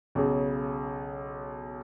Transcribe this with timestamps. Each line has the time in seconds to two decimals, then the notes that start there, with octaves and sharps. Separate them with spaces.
0.15 B1 C#3